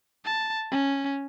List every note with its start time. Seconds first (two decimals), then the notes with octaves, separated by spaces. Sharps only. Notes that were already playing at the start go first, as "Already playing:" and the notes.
0.25 A5
0.71 C#4